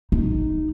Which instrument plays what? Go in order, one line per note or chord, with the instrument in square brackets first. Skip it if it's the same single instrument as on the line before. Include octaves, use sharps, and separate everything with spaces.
[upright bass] D#4